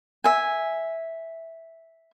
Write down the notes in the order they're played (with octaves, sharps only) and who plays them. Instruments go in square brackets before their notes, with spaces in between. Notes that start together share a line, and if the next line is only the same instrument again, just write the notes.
[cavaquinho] E5 G#5